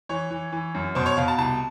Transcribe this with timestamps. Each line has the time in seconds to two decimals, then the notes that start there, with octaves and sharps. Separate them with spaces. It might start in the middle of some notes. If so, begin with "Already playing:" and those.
0.09 E3 C#5
0.30 E3
0.52 E3
0.74 F#2
0.95 B2 C5
1.06 C#5
1.17 B2 F5
1.28 A5
1.38 C2 A5